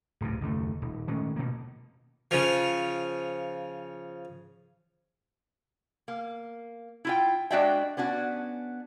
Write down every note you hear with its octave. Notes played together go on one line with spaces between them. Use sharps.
D1 D2 G2 C3
F#1 D#2 A3
D#1
D#3 G#3 A3 C#4
B2 A#3
C#3 F3
A#3
E4 F4 G5
G#3 D4 F#4 D5 E5 G5
B3 C#4 D4 F#4